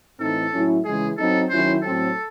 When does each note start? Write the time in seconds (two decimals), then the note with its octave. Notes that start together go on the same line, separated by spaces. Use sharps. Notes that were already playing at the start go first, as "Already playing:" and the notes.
0.19 A2 E3 C4 D#4 A4
0.52 A2 F#3 C#4 E4
0.85 C#3 E3 G#3 G#4
1.17 F#3 C4 D#4 A4
1.50 D#3 F#3 C#4 E4 C5
1.82 A2 F#3 C4 A4